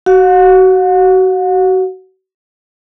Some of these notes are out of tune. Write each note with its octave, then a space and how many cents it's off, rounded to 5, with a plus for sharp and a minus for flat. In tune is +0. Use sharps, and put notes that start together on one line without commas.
F#4 +30 F#5 -45